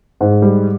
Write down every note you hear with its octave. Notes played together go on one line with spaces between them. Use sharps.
G#2
G3